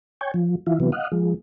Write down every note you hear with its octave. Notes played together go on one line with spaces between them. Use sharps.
C#5 G5 G#5
F3
E3 E4 F4
C3 E3 F#3 B3
D#5 F5 F#5
F3 G#3